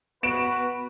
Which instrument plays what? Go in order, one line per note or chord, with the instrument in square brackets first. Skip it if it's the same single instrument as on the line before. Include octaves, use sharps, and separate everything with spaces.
[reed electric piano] B3 [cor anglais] F#4 [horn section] B4 [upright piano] D7 E7